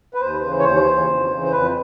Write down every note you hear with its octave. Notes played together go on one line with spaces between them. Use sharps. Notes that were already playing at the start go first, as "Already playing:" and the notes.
B4
D#2 C5
C#3 E3
C#5
D#2 C5
C#3 E3
F2
C#3 E3
C5
F2 B4